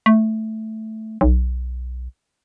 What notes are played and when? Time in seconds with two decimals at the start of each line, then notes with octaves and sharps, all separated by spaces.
0.06 A3
1.21 B1